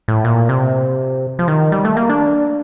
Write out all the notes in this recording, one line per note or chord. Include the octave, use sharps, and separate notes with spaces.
A2
A#2
C3
F3
D#3
G3
A3
A#3
D4